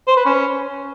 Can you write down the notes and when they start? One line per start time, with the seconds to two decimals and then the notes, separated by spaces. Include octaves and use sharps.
0.08 C5
0.17 B4
0.26 C#4